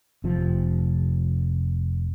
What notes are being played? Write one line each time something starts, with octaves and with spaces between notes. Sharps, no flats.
F1 C3 F3